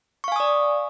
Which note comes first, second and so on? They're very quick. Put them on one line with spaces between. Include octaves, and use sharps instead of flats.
C#6 F5 G#5 D#6 D5